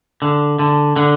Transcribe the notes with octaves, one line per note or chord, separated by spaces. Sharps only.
D3
D3
D3